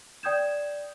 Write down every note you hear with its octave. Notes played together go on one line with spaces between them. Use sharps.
D5 G5 D#6 G6 G#6 E7